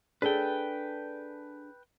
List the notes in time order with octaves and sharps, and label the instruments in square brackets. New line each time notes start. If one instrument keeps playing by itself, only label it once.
[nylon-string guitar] D4 G#4 A4 [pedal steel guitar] B4 G5